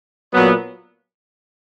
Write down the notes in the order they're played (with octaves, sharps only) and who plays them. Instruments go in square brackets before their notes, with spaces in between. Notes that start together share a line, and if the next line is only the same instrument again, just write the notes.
[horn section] A#2 F#3 B3